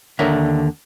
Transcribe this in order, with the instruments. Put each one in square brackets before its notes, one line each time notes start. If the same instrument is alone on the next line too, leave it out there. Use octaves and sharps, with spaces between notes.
[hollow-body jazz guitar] D#2 D3 A#4 C#5 E5